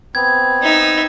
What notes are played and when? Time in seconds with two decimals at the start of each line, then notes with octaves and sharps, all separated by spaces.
0.15 B3 C4 G#6
0.62 D#4 E5